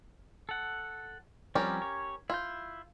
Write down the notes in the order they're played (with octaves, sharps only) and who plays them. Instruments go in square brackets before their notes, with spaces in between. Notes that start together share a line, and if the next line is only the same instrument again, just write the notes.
[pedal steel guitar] A4 F#5
[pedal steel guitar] F3 G3 C4 [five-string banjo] C#4 G4 A#4
[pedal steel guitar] C#5
[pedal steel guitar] E4 G6 [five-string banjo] F4